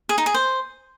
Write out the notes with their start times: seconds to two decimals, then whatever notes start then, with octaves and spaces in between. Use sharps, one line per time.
0.09 G#4
0.18 D#4
0.26 G#4
0.34 C5